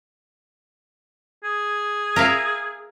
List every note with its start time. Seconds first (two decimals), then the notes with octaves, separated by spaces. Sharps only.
1.44 G#4
2.16 A#4 E5 F5